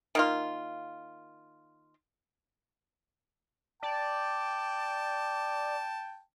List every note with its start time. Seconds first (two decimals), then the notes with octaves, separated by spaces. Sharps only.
0.15 D#3 A#3 F4
3.83 D5 G5 A5